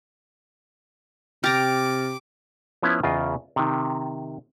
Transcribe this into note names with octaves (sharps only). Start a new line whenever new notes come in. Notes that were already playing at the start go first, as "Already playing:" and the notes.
C3 G4 A#5 D6 F6 A6 A#6
F3 B3 C#4 E4
E2 C#3 F4 D#5
C3 D#3